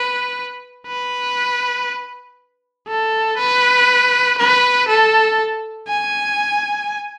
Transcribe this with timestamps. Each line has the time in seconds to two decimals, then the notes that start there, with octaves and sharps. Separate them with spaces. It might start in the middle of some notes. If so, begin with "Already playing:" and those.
Already playing: B4
0.87 B4
2.88 A4
3.38 B4
4.38 B4
4.88 A4
5.88 G#5